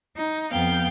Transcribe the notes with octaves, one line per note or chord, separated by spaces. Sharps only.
D#4
F2 B3 F5 G5 G6